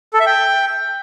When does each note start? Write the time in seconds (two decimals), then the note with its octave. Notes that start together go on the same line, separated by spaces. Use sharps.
0.14 A4
0.20 E5
0.26 G5